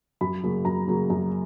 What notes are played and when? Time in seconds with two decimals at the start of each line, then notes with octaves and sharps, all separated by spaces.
0.21 F#2 B5
0.44 C#3 F#3 A#3
0.65 F#2 A#5
0.87 C#3 F#3 A#3
1.10 F#2